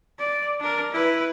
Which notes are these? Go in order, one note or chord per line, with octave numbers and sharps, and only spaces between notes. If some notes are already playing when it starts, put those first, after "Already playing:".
D5
D4 A#4
E4 B4